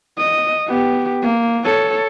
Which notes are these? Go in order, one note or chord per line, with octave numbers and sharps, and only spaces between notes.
D#5
B3 G4
A#3
A4 C#5